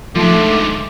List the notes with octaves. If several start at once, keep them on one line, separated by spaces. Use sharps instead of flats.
G#2 D3 F3 A3 C6 D6